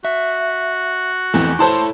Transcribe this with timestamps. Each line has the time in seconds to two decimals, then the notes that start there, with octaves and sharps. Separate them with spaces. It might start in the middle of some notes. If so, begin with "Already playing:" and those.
0.05 F#4 E5
1.34 E2 A3 C4 A4
1.59 E4 A4 C5 C#5 A5 C6